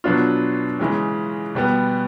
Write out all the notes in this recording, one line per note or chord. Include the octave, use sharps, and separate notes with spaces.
B2 F#3 B3 D4 F4
C#3 E3 G#3 C#4
B2 G3 B3